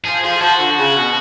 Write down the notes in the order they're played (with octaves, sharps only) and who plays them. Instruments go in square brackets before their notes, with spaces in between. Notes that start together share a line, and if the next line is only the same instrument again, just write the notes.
[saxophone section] F3 [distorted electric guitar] G#4
[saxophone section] F3 [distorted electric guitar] G#4
[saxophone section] F3 [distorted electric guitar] F#4
[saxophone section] D3
C#3
B2